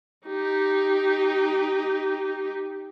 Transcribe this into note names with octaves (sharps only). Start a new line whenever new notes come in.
D#4 G4